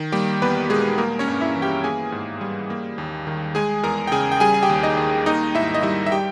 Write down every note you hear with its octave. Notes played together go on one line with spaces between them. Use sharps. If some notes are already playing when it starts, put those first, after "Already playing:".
Already playing: D#3
G3 A#3 G4
E2 B3 B4
B2 G#3 G#4
A#3 A#4
C#4 C#5
G2
E4 E5
E3
G4 G5
A#3 G#4 G#5
G#2
G3
A#3
D#2
D#3
G#3 G#4 G#5
E2 A#4 A#5
G5
C#3 G#4 G#5
G5
G3 G#4 G#5
G#5
G4 G5
D#2
D#4 D#5
D#3
A#3 D#4 D#5
G#2 E4 E5
D#5
G3 E4 E5
E5
G3 G4 G5